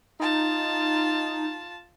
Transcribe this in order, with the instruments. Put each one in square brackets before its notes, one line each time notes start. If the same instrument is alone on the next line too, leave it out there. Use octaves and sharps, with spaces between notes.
[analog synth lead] D#4 [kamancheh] F4 A5